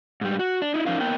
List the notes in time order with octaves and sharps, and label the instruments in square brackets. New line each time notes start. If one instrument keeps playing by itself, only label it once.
[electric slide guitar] G#2 G3
F#4
D4
D#4 E4
F3 C#4 D#4 F4 A#4 F5
A#3 B3 A#4 G5